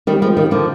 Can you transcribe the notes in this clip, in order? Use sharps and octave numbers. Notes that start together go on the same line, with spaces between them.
D#3 G3
F3 G#3
D#3 G3
D3 F3